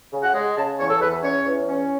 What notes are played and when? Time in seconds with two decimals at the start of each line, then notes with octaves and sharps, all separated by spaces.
0.12 C#3
0.23 F#5
0.34 G#3
0.56 C#3 A5
0.78 E2 C#5
0.90 A4
1.01 E2 B4
1.23 C#4 C#5
1.45 E2
1.68 C#4